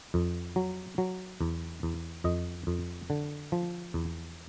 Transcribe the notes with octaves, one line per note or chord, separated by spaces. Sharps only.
F2
F#3
F#3
E2
E2
F2 D#5
F2
D3
F3
E2